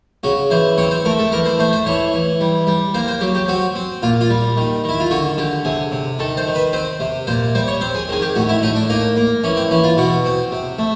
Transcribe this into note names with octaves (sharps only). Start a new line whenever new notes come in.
C#3 F#4
E3 C5
C4 C#5
C5
A3 A#4
A4
E3 A#4
C5
A3 C5
C5
E3 C#5
E3
G3
G3
A#3 C5
C5
F#3 G4
G4
C4 F#4
C4
A#2 F4
F4
G3
D#3
D#3
E4
F4
D3 F#4
D3 G4
C3 G#4
C3
D#3 A4
C5
D#3
B4
C4 C5
C3
A#2 C5
G3 C5
C#5
C4 C5
G#4
D#3 G#4
G4
A2 F#4
E4
A2 D#4
D4
A#3 D#4
A#3
E3 C#4
C4
E3 C#4
F4
B2 F#4
C4
C3
A3